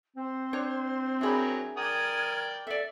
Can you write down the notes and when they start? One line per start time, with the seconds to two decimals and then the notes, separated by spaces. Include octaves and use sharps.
0.17 C4 C5
0.53 D4 C#5
1.21 F#3 D4 G#4 A#4 E5 B5
1.77 A#4 D5 G5 D#6 F6 G#6
2.67 A4 D5 E5